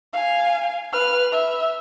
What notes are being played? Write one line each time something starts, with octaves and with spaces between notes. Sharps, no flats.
F5 G#5
B4 F6
E5